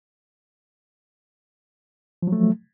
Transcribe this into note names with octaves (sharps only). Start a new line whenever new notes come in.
F3 F#3 A3